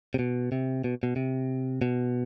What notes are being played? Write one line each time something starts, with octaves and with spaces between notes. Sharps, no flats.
C3
B2
C3
B2
B2
C3
B2